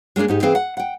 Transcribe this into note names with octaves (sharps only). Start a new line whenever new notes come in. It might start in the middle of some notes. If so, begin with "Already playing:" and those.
G#3 A#3 C#4 D4 G#4
G#2 D#4 G4
E3 C4 G#4 F5
F#5
F#5 G5